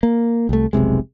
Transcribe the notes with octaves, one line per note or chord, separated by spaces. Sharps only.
A#3
C2 A3
F1 B1 C3 G#3